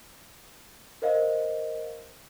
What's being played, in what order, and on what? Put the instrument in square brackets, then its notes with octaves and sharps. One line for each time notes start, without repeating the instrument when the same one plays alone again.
[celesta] A#4 C5 D#5 F5